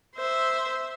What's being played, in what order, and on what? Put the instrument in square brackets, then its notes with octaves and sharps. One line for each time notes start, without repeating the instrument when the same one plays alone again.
[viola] C5 E5